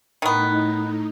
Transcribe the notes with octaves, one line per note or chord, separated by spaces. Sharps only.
A2 D#3 B3 D#4